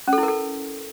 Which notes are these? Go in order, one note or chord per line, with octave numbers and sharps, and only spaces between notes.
C#4
A4
E4
A#4
A4